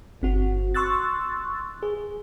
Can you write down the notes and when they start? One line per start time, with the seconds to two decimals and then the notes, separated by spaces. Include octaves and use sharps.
0.22 G1 C4 F#4
0.74 C6 C#6 E6 F#6 A6
1.83 G#4